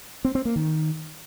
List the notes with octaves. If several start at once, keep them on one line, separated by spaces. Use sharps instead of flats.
C4
C4
A#3
D#3